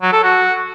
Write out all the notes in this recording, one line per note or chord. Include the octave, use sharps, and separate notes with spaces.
F#3
A4
F#4